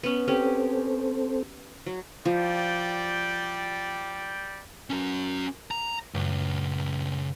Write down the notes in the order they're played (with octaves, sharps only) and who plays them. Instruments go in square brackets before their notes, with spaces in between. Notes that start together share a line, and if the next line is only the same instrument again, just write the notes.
[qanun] B3 C#4
[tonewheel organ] C4 A4 C5 [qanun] C#4 G4
[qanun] F#3
[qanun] F3 [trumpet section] G3 D5 G5
[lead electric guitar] C#4 F#4 [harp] A#4 A5
[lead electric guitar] A#5
[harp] F#2 A#2 F#3 [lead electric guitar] C#3 B4